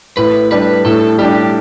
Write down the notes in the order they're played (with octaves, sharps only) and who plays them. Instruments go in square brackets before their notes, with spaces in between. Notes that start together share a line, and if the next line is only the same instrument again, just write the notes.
[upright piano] A2 [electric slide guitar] B4
[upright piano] G3 D4 [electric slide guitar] B4
[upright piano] A2 [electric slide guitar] A4
[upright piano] G3 D4 [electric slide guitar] G4